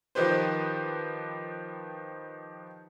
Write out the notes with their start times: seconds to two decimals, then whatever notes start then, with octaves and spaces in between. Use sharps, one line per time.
0.15 D#3 F3 G4 B4 C5